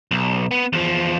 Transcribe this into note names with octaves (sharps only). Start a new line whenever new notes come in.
B1
B3
E2 F3